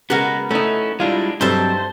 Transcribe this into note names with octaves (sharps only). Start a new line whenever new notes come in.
C#3 G#3 B3 F#4 A#4 B4
A3 C#4 D#4 E4
G3 G#3 D4 E4 F4 F5
G2 F#3 C4 D#4 A4 C5 E5 A5